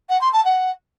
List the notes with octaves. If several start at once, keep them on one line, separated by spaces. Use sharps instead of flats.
F#5
C6
A5
F#5